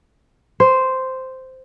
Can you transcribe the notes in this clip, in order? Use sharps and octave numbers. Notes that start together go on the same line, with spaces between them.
C5